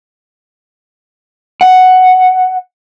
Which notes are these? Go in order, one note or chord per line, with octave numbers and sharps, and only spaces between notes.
F#5